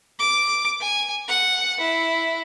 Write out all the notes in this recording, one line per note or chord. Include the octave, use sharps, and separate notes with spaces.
D6
G#5
F#5
E4